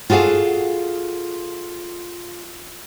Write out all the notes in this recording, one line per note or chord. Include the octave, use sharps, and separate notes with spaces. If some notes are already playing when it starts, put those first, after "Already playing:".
F4 F#4 G#4 A4 F5